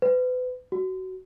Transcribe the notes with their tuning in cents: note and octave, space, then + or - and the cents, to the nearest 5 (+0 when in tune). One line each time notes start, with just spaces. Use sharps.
B4 +35
F#4 +20